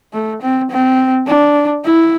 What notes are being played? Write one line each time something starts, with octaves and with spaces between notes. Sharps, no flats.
A3
C4
C4
D4
E4